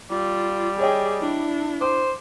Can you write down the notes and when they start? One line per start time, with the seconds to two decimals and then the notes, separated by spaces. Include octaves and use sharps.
0.11 G3 F4
0.79 G#4 C#5 D#5 G5
1.21 D4 E4
1.81 C5 D6